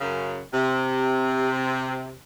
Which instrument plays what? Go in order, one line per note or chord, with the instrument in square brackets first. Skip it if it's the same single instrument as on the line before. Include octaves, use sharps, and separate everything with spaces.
[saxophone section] F#2 C#3
C3